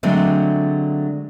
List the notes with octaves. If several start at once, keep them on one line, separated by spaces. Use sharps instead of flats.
D3 F#3 G#3 A3 C4